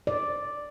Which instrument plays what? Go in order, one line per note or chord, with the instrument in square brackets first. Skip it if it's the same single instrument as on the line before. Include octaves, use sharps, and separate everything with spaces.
[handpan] D5